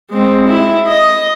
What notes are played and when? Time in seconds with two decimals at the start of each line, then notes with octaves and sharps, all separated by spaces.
0.10 G#3 C4
0.49 E4
0.88 D#5